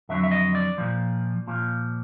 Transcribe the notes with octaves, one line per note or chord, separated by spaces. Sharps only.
F2 D3 F#3 E5
E5
D#5
D5
A#2 F3
A#2 F3